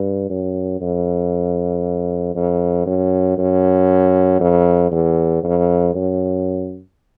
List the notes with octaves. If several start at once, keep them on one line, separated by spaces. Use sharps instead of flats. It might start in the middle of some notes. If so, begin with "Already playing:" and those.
Already playing: G2
F#2
F2
F2
F#2
F#2
F2
E2
F2
F#2